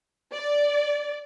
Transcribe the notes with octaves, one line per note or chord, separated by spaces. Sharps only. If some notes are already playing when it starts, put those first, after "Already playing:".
D5